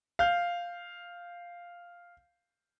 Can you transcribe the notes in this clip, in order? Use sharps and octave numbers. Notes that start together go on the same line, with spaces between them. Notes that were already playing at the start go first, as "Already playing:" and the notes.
F5 G6